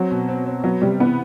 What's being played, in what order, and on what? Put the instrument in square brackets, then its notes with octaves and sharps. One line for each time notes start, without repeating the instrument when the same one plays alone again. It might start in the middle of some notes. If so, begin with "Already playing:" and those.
Already playing: [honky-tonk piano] F#3 [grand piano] C4
[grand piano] B2
C4
C4
[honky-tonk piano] F#3 [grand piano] B3
[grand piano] C3 [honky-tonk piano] G3
[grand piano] E3 [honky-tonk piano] B3